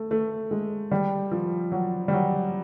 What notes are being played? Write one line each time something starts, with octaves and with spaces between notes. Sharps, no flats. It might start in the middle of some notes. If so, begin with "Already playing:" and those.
Already playing: A3
A3
G#3
G3
F3
F#3
G3
F#3